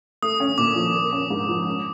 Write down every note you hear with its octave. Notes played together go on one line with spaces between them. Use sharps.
A3 D#6
C#4
A#2 D6
F3
A#3
C#4
G#2
F3
C#4